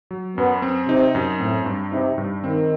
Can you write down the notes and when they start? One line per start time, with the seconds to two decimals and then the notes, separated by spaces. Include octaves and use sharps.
0.11 F#3
0.37 F#2 B3
0.62 C4
0.88 C3 D#4
1.15 F#2
1.40 A2 C4
1.66 G2
1.92 C3 D#4
2.18 G2
2.44 D#3 C4